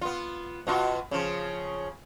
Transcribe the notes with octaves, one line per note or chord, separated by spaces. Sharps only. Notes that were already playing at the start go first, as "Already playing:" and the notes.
B3 F4
B2 F4 F#4
C#3 F3